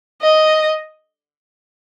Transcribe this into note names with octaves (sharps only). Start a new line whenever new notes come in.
D#5